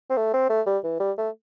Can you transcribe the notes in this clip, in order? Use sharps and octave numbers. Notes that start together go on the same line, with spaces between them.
C4
A3
C4
A3
G3
E3
G3
A3